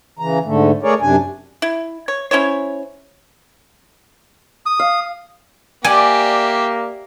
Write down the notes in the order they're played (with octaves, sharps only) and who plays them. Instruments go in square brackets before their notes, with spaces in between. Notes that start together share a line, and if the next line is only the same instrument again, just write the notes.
[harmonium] C#3 E3 A#5
G#2 D3 A3
A3 G#4 A#4 C#5 D5
F#2 C3 D4 G#5
[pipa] E4
C#5
C#4 E4 C5 C#5
[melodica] D#6
[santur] F5
[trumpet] A#3 [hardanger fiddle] G4 E5 [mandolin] D5 [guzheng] G#5